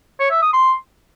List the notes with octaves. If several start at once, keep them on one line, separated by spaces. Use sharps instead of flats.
C#5
E5
D#6
C6